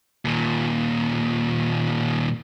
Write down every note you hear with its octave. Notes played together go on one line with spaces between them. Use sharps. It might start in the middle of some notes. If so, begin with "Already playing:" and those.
D#2 A#2